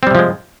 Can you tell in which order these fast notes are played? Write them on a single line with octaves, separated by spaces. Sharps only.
C4 G3 C3 F3 G#3